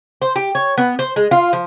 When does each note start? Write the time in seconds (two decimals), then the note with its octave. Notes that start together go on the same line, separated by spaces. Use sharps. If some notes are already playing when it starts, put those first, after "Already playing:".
0.22 C5
0.36 G4
0.55 C#5
0.78 B3
0.99 C5
1.16 G#3
1.31 F4
1.53 F3